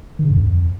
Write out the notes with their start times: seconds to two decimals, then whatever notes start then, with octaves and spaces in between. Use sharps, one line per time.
0.19 D#3
0.25 C#3
0.30 G2
0.36 E2
0.42 F2